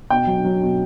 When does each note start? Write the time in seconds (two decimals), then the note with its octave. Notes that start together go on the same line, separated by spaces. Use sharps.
0.10 B2 G5
0.27 F#3
0.44 F#3
0.62 B2